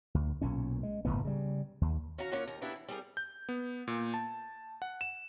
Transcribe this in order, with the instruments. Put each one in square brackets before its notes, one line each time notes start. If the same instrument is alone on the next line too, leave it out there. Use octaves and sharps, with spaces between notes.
[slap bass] D2
B1 A#2 C#4
G#3
F#1 E2 A2 B3
C#3 G3
D#2
[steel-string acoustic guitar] C#4 F#4 F5 A#5
A#3 C#4 F4 A#4 C#5 F#5
D#2 A#4
C#3 A#3 B3 D4 E4 G4
E3
G3 C4 G#4 A#4
[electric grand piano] G6
B3
A#2
A5
F#5
E7